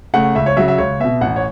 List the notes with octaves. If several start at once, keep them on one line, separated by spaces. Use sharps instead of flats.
C#3 A3 F#5
C#2 E5
C#5
C#3 F#3 E5
E5
C#2 C#5
B2 B3 E5
A1 F#5
C#5